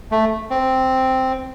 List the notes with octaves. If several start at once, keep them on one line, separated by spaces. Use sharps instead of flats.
A3
C4